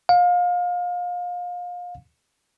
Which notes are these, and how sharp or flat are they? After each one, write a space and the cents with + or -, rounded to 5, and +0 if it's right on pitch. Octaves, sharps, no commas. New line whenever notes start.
F5 +30